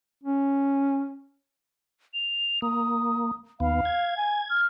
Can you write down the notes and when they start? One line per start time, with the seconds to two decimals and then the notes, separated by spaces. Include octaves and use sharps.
0.23 C#4
2.14 F7
2.62 A#3 D#6
3.60 D#2 B3 F5
3.85 G#6
4.17 G#5
4.49 F6